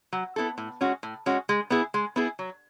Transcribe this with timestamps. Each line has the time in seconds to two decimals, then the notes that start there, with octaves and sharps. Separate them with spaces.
0.13 F#3
0.36 B3 E4 A4
0.58 A2
0.81 G#3 C#4 F#4
1.03 A2
1.26 G#3 C#4 F#4
1.49 G#3
1.70 B3 E4 G#4
1.94 G#3
2.16 B3 E4 G#4
2.39 F#3